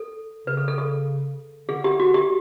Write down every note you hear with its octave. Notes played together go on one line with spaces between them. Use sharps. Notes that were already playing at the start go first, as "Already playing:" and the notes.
Already playing: A4
C#3 B4
A4
A4
A4
D3 G#4
G4
F#4
G4